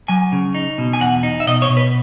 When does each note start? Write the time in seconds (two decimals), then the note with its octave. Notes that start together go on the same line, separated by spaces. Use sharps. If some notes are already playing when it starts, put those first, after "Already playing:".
0.08 F#3 G#5
0.32 C#3
0.54 D#4
0.78 B2
0.93 G#5
1.01 E2 F#5
1.23 D#4
1.40 E5
1.47 B2 D#5
1.62 C#5
1.70 B2
1.77 B4